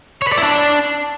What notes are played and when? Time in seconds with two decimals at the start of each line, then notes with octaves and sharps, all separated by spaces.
0.22 C#5
0.27 B4
0.32 D5
0.38 E4
0.43 D4